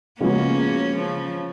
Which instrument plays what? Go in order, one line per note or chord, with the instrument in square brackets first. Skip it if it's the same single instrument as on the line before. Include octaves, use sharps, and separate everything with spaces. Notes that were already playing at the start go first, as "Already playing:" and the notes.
[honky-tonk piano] C#3 F3 G#3 B3 F#4 [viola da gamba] A#3 C#4
[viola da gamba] C#3 F3